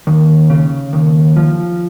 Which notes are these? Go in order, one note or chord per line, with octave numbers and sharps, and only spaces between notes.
D#2
C#3
D#2
F3